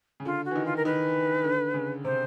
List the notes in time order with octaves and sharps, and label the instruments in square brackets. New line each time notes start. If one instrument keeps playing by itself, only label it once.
[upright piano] C#3
[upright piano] D3 [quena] F4
[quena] F#4
[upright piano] E3
D#3
[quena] F4
A#4
[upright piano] D#3 [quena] B4
[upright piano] D3
C#3
[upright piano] C3 [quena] C5